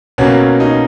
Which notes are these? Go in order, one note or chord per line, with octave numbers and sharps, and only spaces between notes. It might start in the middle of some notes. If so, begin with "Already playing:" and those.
B2 F#3 A#3 C#4
D#4